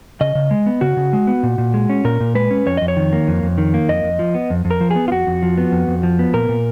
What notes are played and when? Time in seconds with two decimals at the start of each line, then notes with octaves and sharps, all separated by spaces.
0.21 C#3 D#5
0.35 C#3
0.51 G#3
0.66 B3
0.81 C#3 F#4
0.97 C#3
1.13 G#3
1.27 B3
1.43 A#2
1.58 A#2
1.74 G#3
1.90 C#4
2.05 A#2 A#4
2.20 A#2
2.35 G#3 B4
2.51 C#4
2.66 F2 C#5
2.77 F2 D#5
2.88 C#5
2.97 D#3
3.12 A#3
3.28 F2
3.43 F2
3.58 D#3
3.74 A#3
3.89 F2 D#5
4.03 F2
4.19 F3
4.35 B3
4.50 F2
4.65 F2
4.71 A#4
4.81 F3
4.91 B3 G#4
5.08 F4
5.12 F2 F#4
5.27 F2
5.43 F3
5.57 B3
5.72 F2
5.88 F2
6.03 F3
6.19 B3
6.34 A#2 A#4
6.49 A#2